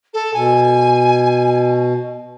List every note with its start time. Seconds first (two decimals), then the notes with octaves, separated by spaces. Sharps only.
0.14 A4
0.34 B2 G#5